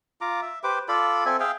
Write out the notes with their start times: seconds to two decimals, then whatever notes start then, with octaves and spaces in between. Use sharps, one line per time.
0.21 F4 A#5 D6
0.42 E5
0.64 G4 B4 C5 D6
0.88 F4 A4 D5 B5
1.25 C4 A4 E5 G#5
1.40 G#4 E5 F5 G5